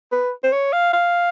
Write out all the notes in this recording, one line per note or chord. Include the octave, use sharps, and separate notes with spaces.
B4
C5
C#5
F5
F5